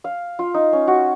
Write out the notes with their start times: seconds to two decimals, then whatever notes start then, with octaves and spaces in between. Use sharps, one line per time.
0.04 F5
0.39 F4
0.54 D#4
0.73 C#4
0.87 F#4